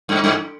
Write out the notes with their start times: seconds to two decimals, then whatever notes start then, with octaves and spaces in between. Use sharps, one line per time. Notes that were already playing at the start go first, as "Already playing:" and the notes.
0.09 G2
0.24 G2